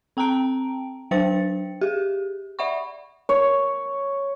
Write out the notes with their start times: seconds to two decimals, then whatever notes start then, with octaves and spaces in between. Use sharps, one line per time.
0.17 C4 G5 A5 A#5 D7
1.11 F#3 D4 C5 G5 A6 C#7
1.81 G4 G#4
2.59 D5 E5 F#5 B5 C#6
3.29 C#5